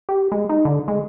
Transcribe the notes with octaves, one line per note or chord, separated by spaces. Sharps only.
G4
G#3
D#4
D3
G#3